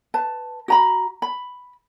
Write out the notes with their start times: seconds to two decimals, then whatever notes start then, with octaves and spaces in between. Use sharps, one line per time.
0.14 B4 A5
0.68 F#4 A#5 B5
1.22 B5